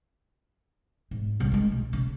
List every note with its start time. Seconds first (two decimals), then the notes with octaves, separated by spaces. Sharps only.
1.11 G#2
1.40 C2 C#3
1.52 D#3 G#3
1.72 B1
1.93 C#3